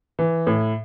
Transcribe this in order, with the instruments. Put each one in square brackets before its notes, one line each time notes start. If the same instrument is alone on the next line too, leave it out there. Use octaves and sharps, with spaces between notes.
[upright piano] E3
A2